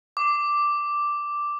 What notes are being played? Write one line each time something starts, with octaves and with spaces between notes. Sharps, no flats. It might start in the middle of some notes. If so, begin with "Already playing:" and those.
D6